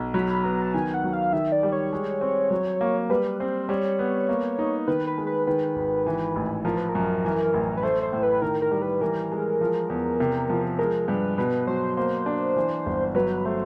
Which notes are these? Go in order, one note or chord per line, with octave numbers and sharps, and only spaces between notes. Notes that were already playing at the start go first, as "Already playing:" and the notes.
Already playing: B1
F#3 B5
B3 A#5
A5
D#3 G#5
F#5
F#3
F5
D#3 E5
D5
G3
C#5
G#3
C4
F#3
A#3
G3 B4
C4 C5
G3 C#5
B3
A#3
D#4
D#3 B4
B4
G#3
B4
D#3 B4
G#1
E3
A1
F3 A#4
B4
A#4
F#2
E3
A1
B4
A3 C5
C5
A2
B4
D#3 A#4
A#4
G3
B4
E3 A#4
G#3
F3
E2
C3
F3
G#3 A#4
G2 B4
B2 B4
F#3 C5
A#3 C5
D4
E3
G1
F#3 B4
A3 C5